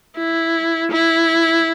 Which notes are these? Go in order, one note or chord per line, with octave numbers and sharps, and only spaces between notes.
E4
E4